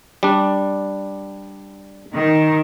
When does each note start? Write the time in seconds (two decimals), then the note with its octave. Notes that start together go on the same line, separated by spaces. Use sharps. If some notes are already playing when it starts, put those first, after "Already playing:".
0.23 G3 D4
2.16 D#3